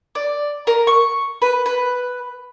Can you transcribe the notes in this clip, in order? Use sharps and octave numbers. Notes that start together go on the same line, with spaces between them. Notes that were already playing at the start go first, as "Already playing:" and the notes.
D5
A#4
C#6
B4
B4